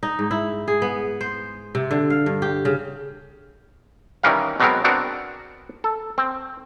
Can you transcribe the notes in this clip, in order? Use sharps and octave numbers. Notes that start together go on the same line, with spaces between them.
D#4
G#2
E4
G#4
B3
C5
C3
D3
F5
G2
G4
C#3
D#3 E3 G3 C#4 A#4 F5
B2 F#3 G#3 B3 C4 A#4
B3 C4 D4 F#4 A#4
A4
C4